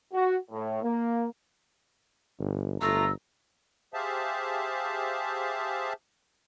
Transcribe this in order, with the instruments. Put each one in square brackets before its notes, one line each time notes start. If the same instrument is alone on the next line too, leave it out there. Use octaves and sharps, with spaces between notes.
[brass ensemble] F#4
A2
A#3
[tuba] G1
[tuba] G1 [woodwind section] A3 F4 A#5 [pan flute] E6
[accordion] G4 G#4 C5 E5 F5 A5